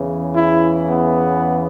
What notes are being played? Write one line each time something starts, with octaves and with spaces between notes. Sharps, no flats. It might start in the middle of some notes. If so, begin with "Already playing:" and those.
Already playing: E2 C#3 E3
E4
B3